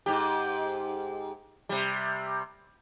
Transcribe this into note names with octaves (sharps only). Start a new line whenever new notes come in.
G#2 G4
C3 G3